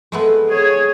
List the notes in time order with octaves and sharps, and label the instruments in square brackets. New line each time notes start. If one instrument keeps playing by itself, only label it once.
[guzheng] G#3 A3 B3
[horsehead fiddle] G#4 C#5